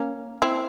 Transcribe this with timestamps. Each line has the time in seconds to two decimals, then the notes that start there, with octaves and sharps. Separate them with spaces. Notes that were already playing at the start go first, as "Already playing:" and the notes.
Already playing: A#3 C#4
0.42 C4 E4